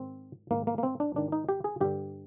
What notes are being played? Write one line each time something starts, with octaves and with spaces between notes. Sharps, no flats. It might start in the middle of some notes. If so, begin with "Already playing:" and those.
Already playing: G#2 D#3 C4
G#2 D#3 A#3
A#3
A#3
C4
D4
G#2 D#3 D4
D#4
G4
G#4
G2 D3 G4